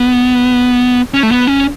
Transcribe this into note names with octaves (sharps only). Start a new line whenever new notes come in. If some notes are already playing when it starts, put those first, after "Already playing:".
Already playing: B3
C#4
A3
B3
C#4